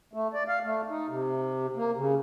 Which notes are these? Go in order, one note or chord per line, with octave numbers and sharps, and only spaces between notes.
A3
D5
F5
A3
D#4
C3
A#3
C#3